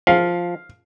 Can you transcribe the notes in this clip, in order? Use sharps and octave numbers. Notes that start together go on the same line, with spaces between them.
F3 F5